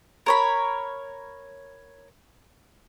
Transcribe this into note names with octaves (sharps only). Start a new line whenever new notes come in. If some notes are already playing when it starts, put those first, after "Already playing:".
A#4 C#5 B5